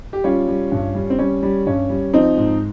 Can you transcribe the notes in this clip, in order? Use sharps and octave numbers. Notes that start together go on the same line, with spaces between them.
G4
G3 C#4 F4
G3
G2
G3
C4
G3 C#4
G3
G2 C#4
G3
F3 C4 D#4
G#2